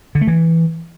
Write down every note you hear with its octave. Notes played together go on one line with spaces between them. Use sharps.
D3
A3
E3